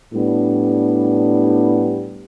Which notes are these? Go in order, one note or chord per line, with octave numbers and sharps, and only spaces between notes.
A2 G3 B3 D4